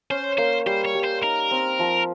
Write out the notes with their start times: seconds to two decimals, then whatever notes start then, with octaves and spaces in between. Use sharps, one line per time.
0.10 C#4 C5
0.38 A#3 C5
0.66 G3 C5
0.85 C#5
0.95 G3
1.04 C5
1.23 D#4 A#4
1.51 C4
1.79 F3